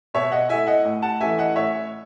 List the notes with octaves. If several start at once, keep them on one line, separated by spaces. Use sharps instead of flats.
B2 C#5 E5
D#5 F#5
A3 E4 E5 G#5
D#5 F#5
A2
F#5 A5
E3 A3 C#4 E5 G#5
D#5 F#5
A2 C#5 E5